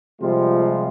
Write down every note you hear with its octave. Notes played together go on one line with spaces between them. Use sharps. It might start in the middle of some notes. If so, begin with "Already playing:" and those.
C3 F3 G3 G#3 F4